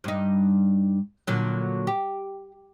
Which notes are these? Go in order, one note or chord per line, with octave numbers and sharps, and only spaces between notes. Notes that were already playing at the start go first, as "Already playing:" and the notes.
G2 D#4
A#2 D3 F#3
G4